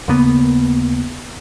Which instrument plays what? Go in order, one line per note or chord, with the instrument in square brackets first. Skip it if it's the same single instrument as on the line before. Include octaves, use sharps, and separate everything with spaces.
[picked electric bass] D#2 C#3 A#3 B3